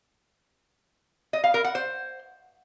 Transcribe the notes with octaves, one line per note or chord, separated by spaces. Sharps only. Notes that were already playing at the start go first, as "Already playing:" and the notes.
D#5
F5
A#4
F#5
C5